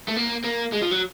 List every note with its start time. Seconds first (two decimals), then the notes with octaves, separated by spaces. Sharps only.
0.08 A3
0.16 A#3
0.44 A#3
0.72 G#3
0.82 F3
0.91 F#3